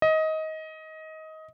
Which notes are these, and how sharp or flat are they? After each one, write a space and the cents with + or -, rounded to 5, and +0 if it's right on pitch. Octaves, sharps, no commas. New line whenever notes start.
D#5 +20